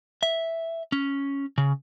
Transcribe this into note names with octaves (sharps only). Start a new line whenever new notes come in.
E5
C#4
C#3